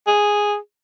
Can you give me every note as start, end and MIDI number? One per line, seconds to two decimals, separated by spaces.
0.07 0.56 68